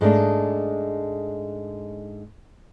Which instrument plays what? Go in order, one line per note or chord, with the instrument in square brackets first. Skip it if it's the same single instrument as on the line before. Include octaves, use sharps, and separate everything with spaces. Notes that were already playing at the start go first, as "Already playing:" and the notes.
[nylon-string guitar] G#2 G#3 A3 D4